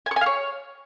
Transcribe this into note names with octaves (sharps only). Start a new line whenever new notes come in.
G#5
C#6
G#5
F5
C#5